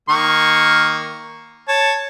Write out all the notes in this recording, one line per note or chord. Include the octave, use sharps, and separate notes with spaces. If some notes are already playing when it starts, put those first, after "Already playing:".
D#3 A#3 C#6
C#5 A5